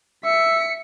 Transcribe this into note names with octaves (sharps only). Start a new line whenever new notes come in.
E5 B6 C#7